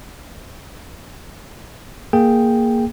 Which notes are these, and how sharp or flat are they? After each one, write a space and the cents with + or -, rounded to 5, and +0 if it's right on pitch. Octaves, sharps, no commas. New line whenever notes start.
A#3 +0 G#4 +0 G5 +0